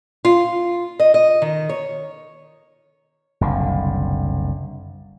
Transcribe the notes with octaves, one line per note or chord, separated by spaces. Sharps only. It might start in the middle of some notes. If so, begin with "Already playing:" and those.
F4
D#5
D#5
D#3
C#5
F#1 C2 D3